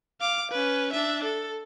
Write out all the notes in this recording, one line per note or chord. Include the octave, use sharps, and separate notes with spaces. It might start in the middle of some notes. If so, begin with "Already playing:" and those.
F5 D6
C#4 B4
D4 E5
A4